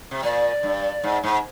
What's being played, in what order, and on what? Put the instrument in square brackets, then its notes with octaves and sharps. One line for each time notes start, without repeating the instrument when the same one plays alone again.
[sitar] C3
[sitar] A#2 [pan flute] D5
[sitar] G2
G#2
G#2